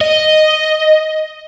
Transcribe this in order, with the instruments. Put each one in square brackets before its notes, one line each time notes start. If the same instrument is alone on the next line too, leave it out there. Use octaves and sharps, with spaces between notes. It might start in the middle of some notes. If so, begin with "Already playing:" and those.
[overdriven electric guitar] D#5